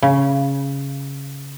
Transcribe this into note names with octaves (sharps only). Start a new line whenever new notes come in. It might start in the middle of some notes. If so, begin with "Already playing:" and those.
C#3